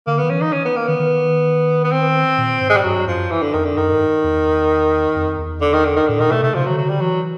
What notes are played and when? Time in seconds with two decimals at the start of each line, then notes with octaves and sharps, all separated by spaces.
0.07 D3 A#3
0.19 D#3 B3
0.30 E3 C#4
0.41 D#4
0.53 C#4
0.65 B3
0.76 A#3
0.88 D#3 B3
0.99 D#3
1.84 B3
1.92 C4
2.38 A#2
2.61 G#2
2.70 G#3
2.77 G3
2.84 G2 F#3
3.07 F#2 F3
3.31 E3
3.42 D3
3.53 F2 D#3
3.65 D3
3.77 F#2 D#3
3.92 G2
4.24 E2
5.15 F2
5.38 E2
5.61 D3
5.73 D#3
5.85 D3
5.96 D#3
6.08 A2 D3
6.19 A#2 D#3
6.31 B2 A3
6.43 C3 A3
6.54 C#3 F3
6.66 F#3
6.70 D3
6.77 F#3
6.85 D3 G3
7.01 E3 F#3